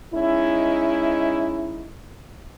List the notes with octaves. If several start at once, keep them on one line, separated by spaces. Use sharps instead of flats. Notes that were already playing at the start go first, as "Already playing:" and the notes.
G#3 C#4 D#4 E4